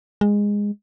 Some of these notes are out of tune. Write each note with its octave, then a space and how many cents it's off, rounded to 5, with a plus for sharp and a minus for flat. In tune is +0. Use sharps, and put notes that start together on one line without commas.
G#3 -15